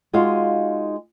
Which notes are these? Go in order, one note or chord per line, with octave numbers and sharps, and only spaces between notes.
G#3 D#4 F4 F#4 F5